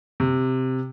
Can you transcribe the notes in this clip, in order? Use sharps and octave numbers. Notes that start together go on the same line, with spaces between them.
C3